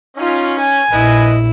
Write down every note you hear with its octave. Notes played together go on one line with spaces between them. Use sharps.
C#4 D#4 F4
G#5
A#1 E4 B4 D#5